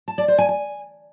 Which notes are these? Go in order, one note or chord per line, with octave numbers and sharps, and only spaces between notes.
A5
D5
C5
G#5
G#5